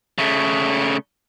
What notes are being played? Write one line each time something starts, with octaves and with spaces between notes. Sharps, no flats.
C#3 A3